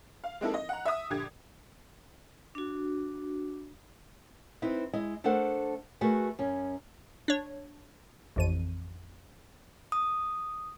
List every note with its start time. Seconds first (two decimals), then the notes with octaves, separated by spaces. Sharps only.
0.24 F5
0.41 G#3 A#3 C4 D#4 E4 A4
0.54 D#5
0.69 F#5 A#5
0.85 E5 D#6
1.10 A#1 D3 G4 G#6
2.55 D4 F#4
4.62 C4 D#4 E4 B4
4.93 G#3 E4 D#5
5.24 A3 D4 A4 A#4 C5 F#5
6.01 A3 F#4 G#4 A#4 B4
6.39 F#2 C#4
7.28 D4 C#5
8.36 A1 F2 D#7
9.92 D#6